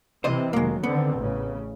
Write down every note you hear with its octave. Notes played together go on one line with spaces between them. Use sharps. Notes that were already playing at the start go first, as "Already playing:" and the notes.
C3 E3 C4 C5 D#5
F1 D#3 F#3 G#3 A#3
D3 D#3 B3 C4
A1 C#3